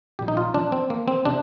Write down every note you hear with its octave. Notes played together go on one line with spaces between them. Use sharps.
A#1 A#2 G3 G4
D#4
F4
D4
C4
A#3
C4
C3 D4